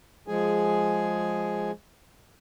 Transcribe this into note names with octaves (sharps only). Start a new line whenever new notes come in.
F3 G#3 G#4 G#5